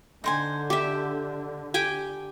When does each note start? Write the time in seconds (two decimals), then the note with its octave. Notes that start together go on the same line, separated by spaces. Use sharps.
0.24 D3 D#4 C5 G#5
0.70 G4 E5
1.74 G4 G5 G#5